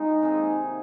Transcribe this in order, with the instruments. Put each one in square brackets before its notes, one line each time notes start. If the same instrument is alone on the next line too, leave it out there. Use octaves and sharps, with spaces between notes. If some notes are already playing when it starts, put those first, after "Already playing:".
Already playing: [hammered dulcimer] G#2 G#3 F4 [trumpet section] D#4
[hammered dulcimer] C3 D#3 A#3 G#4